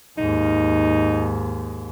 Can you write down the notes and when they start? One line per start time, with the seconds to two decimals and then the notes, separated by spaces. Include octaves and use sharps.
0.18 D#2 G#2 D#4